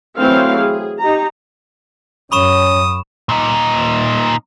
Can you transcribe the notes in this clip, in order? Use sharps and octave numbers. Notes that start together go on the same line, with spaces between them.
E3 F#3 A3 C4 C5 F5
G#4
D#4 G4 A#5
F#2 C#4 B5 C#6 D#6 E7
A#2 D#4